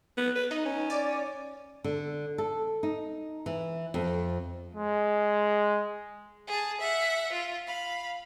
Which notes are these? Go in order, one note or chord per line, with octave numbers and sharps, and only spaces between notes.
B3
B4
D#4 D#5
C#4
D5
D3
A4
D#4
E3
F2
G#3
G#4 A5
E5 F#5
F4
F5 B5